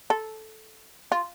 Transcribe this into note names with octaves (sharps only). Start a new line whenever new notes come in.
A4
F4